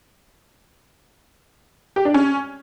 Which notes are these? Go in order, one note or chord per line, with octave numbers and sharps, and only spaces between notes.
G4
D4
C#4